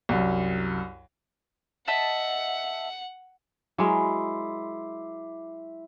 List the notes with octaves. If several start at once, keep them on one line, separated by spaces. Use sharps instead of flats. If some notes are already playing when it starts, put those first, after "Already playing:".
C2 F#2
D#5 E5 F#5 A5
F#3 G#3 E4 A#4 C6 D6